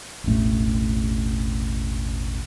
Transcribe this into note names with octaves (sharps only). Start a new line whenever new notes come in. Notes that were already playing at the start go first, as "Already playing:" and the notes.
E1 A1 A3